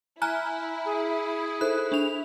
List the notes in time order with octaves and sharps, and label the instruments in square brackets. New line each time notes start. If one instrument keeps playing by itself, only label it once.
[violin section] E4 [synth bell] G#5 A#5 F6 [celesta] F#6
[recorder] G#4
[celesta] D#4 A4 C5 [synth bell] F#6
[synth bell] D4 F7